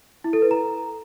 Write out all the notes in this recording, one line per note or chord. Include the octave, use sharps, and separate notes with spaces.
E4
A4
B4
A#5